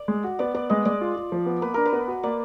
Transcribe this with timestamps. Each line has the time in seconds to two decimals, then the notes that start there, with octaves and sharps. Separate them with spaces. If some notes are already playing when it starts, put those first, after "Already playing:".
Already playing: D5
0.08 G#3
0.24 F#4
0.39 B3 D5
0.54 B3 D5
0.70 G#3 D#5
0.85 G#3 D5
1.01 F4
1.16 F4
1.32 F3
1.46 B3
1.61 A#3 B4
1.74 D4 A#4
1.86 B4
1.93 B3
2.08 F#4
2.23 A#3 D5